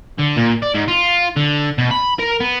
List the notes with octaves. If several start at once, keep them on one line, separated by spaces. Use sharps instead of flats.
D3
A#2
D5
G#2
F4
D3
B2
B5
A#4
B3